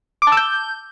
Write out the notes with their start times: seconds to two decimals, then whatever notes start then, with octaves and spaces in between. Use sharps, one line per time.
0.22 D6
0.27 A5
0.32 E6
0.37 G6